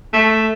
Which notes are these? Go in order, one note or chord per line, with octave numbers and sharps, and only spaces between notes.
A3